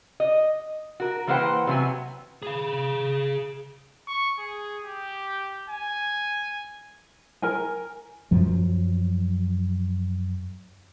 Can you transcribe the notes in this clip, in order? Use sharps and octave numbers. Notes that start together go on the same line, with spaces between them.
D#5
F#4 A#4
E3 A#3 B4 C5 F#5 G5
C3 F#3 B3 G#5
G#4 F5
C#6
G#4
G4
G#5
A#4 G#5
F#2 F3 F#3